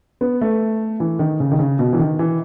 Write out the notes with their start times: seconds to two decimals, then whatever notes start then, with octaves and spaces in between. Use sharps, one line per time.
0.21 B3
0.41 A3
1.00 E3
1.19 D#3
1.40 C#3
1.52 D#3
1.59 C#3
1.79 B2
1.93 E3
1.99 D#3
2.19 E3